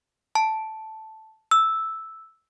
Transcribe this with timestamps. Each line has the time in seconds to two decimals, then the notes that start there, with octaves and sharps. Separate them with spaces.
0.35 A5
1.51 E6